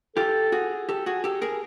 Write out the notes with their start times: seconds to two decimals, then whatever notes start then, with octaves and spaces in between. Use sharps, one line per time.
0.16 F4 G4 A4
0.52 F#4 G#4
0.89 G4 A4
1.06 F#4 G#4
1.24 G4 A4
1.42 G#4 A#4